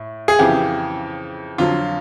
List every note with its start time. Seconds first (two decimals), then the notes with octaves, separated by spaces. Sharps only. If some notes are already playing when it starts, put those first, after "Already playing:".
Already playing: A2
0.28 G#4
0.39 F2 C#3 E3 G4
1.58 F2 D3 F#3 F4